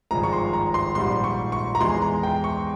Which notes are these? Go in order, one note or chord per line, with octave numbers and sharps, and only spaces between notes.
G#1 G2 F3 G#3 A#5
C#6
C6
A#5
C6
A#1 G#2 G3 C6
C#6
C#6
A#5
E2 E3 G#3 C6
A#5
G5
C#6